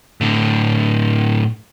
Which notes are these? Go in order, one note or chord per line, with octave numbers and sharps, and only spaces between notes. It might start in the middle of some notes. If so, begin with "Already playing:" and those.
A2 D3